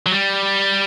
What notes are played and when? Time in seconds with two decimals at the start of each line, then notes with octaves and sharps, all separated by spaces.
0.06 F#3
0.12 G3